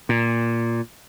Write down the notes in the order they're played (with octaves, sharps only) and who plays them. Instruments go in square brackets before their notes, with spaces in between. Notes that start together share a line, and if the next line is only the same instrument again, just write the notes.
[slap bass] A#2